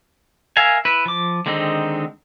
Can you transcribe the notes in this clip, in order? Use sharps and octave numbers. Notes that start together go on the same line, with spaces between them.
A#4 E5 F5 G#5
E4 B4
F3 D6
D3 D#3 G#3 C4 D#4